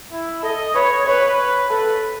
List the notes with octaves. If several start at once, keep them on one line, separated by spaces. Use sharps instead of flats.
E4
A4 D#5
B4 C#5
B4 C#5
A4 B4